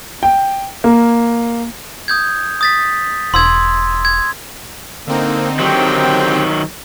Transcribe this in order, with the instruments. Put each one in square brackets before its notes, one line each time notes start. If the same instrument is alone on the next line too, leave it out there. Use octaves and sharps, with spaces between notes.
[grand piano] G5
A#3
[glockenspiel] D#6 G6 G#6
D#6 A6 B6
[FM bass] E1 [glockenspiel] C6 E6 G#6
[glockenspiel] G#6
[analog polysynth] D3 C4 D#4 [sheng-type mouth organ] A#3
[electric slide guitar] D#3 F#3 [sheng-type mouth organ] G4 C5 G5